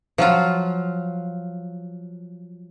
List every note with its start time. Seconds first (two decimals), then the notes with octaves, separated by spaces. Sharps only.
0.18 F3 F#3 F4